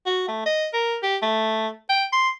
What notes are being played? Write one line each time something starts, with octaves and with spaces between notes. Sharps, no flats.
F#4
A3
D#5
A#4
G4
A3
G5
C6